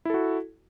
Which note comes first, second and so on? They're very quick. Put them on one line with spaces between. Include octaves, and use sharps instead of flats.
E4 A4 F#4